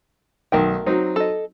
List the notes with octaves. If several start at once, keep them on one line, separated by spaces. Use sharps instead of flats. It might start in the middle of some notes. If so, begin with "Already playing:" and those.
B1 D#3 A3 A#4 G5
F#3 C4 D#4
A4 D#5